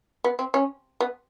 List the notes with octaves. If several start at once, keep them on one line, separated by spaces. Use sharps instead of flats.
B3
C4
C#4
B3